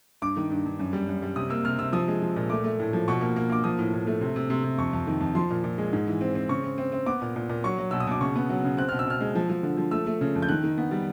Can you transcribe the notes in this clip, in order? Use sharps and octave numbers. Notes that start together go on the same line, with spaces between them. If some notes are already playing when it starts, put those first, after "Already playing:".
G2 D6
D#3
G2
G2
F#2
G3
F#2
G3
C3 D#6
A#3 E6
C3 F6
C3 E6
F3 D#6
G#3
F3
A#2
A3 D6
A3
A2
F3
B2 C#6
A#3
A#3
A#3 D6
F3 D#6
A2
A2
A3
C3
C3
C3
C3
F2 C#6
F2
D#3
F2
F3 C6
A#2
A#2
G#3
G#2
E3
C4
C4
C#3 C#6
C4
C4
C4
B3 D6
A#2
A#2
A#2
F#3 C#6
F#3
B2 E6
D#6
B2 D6
C#3 C#6
B3
F#3
C#3
C4 F#6
B2 F6
E6
B2 F6
G#3
F3
F3
D3
F3
A3 E6
A3
C#3
F2
G6
D#3 F#6
D#3
B3
G3